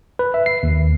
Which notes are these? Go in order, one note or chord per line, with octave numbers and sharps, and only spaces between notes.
B4
E5
C7
D#2